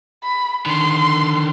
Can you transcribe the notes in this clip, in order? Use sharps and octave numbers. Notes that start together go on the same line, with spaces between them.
B5
D3 D#3 C6